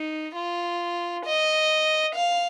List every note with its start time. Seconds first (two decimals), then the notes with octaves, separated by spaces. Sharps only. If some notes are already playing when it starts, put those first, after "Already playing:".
Already playing: D#4
0.36 F4
1.25 D#5
2.15 F5